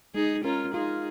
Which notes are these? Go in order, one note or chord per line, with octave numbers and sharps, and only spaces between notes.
G#3 D#4 G#4
C#4 F4 A#4
D#4 F4 G#4